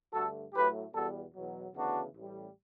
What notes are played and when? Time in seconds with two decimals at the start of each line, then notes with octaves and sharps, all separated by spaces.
0.13 G2 D3 A3 F#4 A4
0.53 A2 F#3 A3 G4 B4
0.93 E2 B2 G3 B3 F#4 A4
1.34 E2 B2 F#3
1.74 D2 C#3 E3 B3 D4 F#4
2.15 A1 A2 G3